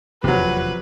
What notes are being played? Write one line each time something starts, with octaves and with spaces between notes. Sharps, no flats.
F1 E2 C3 F3 F#3 B4